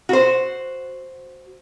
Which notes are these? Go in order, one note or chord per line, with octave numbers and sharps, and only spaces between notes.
F#4 C5